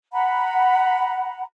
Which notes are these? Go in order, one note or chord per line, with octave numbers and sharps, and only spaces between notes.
F#5 A#5 B5